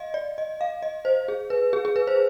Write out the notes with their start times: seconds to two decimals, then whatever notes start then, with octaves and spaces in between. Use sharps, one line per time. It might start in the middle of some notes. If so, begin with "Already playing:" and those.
Already playing: D#5 F5
0.14 D5
0.38 D#5
0.61 F5
0.82 D#5
1.05 C5
1.28 G#4
1.50 B4
1.73 G#4
1.85 G#4
1.96 B4
2.07 C5